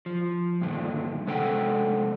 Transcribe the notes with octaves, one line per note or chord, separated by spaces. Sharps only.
F3
G2 A#2 D3 D#3
C3 G#3 D4 A4 F#5 G5